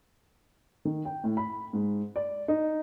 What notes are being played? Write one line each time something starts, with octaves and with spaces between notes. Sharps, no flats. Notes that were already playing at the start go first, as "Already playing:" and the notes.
D#3
G5
A2
B5
G#2
D5
D#4